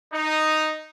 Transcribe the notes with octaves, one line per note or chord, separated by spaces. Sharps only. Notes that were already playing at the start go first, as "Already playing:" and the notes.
D#4